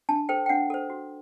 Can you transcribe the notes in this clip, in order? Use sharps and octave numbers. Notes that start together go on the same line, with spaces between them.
D4 A5
A4 C5 G5
G5
D4 F#5
A4 C5
F#4